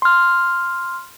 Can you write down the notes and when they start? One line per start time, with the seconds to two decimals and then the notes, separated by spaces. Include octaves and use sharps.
0.02 C6 F6